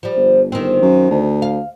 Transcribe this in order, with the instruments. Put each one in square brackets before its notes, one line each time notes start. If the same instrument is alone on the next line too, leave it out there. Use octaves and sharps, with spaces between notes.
[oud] F3 G3
[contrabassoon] G1
[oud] D#3 C4
[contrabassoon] F#2
D2
[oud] F5